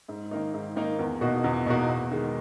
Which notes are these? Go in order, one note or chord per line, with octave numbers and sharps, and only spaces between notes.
G#2
D#3 A#3 D#4
G#2
D#3 A#3 D#4
E2
B2 A#3 D#4 F#4
E2
B2 A#3 D#4 F#4
E2
D#3 G#3